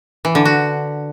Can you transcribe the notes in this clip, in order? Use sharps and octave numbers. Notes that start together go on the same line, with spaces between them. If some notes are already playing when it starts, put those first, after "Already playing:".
E3
D3
F#4